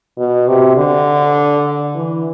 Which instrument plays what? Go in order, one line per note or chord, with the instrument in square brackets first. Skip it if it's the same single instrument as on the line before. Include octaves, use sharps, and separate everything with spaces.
[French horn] B2
C3
D3
E3